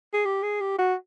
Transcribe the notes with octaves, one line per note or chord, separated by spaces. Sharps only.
G#4
G4
G#4
G4
F#4